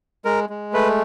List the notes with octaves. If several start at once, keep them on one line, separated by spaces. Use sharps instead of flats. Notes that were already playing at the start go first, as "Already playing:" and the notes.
G#3 A#4
G#3
A3 B4